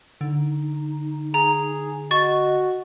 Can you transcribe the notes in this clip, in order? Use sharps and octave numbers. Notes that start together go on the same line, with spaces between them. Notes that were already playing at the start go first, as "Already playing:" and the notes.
D3 D#4
G#4 A#5
F#4 D#5 C#6 A6